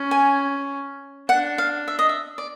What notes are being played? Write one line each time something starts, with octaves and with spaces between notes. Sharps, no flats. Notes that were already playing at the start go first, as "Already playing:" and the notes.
Already playing: C#4
G#5
D4 F#5
F5
E5
D#5
E5
D5